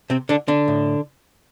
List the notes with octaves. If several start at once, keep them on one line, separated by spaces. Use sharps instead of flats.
C3 C4
D3 D4
D3 D4
A2